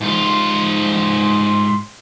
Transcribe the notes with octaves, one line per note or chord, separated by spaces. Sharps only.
G#2 F4